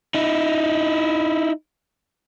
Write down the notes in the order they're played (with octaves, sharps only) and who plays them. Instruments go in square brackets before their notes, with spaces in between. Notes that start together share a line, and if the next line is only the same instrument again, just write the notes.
[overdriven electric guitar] D#4 E4